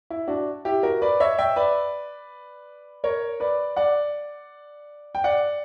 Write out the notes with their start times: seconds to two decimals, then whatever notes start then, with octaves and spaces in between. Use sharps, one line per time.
0.10 E4
0.28 D4 F#4
0.65 E4 G4
0.83 F#4 A#4
1.02 B4 D5
1.20 C#5 E5
1.38 E5 G5
1.56 B4 D5
3.04 A#4 C#5
3.40 B4 D5
3.76 D5 F#5
5.15 G5
5.24 D5 F#5